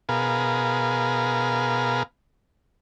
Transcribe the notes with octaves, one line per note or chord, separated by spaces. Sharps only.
B2 G#4 A#4 B4 F5